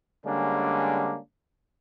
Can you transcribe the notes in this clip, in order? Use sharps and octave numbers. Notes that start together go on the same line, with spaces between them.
D3 G3 G#3 A#3 C#4 D4